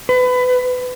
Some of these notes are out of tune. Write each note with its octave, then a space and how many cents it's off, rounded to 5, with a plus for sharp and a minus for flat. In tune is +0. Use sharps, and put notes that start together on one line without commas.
B4 +25